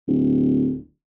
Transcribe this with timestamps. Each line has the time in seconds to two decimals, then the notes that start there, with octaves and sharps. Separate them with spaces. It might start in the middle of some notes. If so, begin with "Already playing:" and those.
0.08 D1